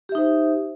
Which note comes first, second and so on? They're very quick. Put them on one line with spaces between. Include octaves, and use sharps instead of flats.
G4 E5 D#4 C5